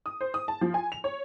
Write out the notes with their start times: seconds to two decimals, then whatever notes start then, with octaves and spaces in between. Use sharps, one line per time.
0.06 D#6
0.21 C5
0.34 D#6
0.48 A5
0.61 F3
0.74 G#5
0.92 F7
1.04 C#5